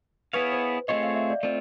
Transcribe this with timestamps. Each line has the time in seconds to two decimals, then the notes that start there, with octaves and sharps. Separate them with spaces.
0.33 B3 E4 G#4 B4 C#5 F5
0.53 C5
0.88 A3 C4 F4 G#4 C#5 D#5
1.03 F5
1.15 E5
1.30 D5
1.43 A3 C4 F4 D5